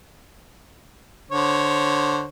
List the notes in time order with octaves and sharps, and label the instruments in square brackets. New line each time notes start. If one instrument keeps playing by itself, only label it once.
[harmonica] D3 C5 C#5